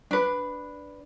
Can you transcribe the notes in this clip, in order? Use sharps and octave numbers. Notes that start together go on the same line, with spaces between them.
D4 B4